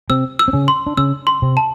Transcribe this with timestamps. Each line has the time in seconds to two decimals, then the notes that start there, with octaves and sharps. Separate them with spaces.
0.09 C3 C4 E6
0.39 E6
0.48 C4
0.53 C#3 C#4
0.68 C6
0.87 D4
0.97 C#3 C#4 E6
1.27 C6
1.42 C3 C4
1.57 A5